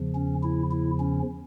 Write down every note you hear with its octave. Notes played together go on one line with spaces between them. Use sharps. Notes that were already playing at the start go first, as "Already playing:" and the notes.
Already playing: E2 C#3 F3
C#4
E4
E4
C#4